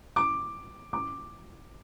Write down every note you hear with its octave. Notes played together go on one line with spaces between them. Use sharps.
D6
D6